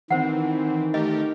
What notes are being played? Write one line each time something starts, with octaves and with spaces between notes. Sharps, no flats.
D#3 E3 C4 C5 F#5
A3 G4 A#4 D#5